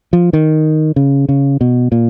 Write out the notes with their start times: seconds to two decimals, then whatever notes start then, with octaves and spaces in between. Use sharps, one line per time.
0.13 F3
0.33 D#3
0.96 C#3
1.29 C#3
1.61 B2
1.92 A#2